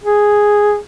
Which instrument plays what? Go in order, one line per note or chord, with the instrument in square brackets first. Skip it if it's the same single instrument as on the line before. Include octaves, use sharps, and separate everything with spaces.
[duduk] G#4